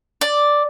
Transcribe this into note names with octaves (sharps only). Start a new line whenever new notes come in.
D5